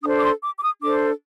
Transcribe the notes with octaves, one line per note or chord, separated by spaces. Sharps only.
D4 A4 C5 D#6
D6
C6
D6
D6
D#6
D4 A4 C5 D6